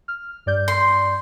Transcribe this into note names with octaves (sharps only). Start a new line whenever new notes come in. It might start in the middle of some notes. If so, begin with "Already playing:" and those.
F6
G2 D5 G6
C6